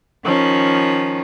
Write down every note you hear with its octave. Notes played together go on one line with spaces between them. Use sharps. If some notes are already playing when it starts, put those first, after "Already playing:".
D#3 F3 C#4